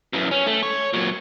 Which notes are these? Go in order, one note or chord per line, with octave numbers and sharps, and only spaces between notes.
F#2 E3
C#4
A3
C#5
A#2 F#3